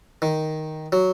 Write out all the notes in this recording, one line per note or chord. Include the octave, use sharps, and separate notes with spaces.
D#3
F#3